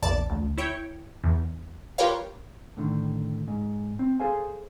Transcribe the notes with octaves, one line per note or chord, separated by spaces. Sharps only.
A#1 E2 D5 A5 A6
D2
E4 C#5 G5
E2
F4 G4 A#4 B4 C#5 F5
A2 D3 D#3
G#2
C4
G#4 A4 C5 F5 G#5